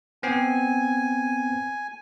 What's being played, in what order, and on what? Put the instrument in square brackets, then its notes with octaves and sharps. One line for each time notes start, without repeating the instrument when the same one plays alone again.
[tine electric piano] B3 C4 [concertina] G#5